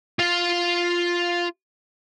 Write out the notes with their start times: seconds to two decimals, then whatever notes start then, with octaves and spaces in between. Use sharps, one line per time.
0.19 F4 F5